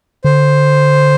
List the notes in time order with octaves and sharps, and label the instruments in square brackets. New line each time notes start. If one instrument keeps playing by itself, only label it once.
[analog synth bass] D3 [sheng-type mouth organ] C5